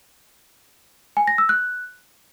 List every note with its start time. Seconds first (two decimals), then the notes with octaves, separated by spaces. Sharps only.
1.17 G#5
1.27 A#6
1.38 E6
1.49 F#6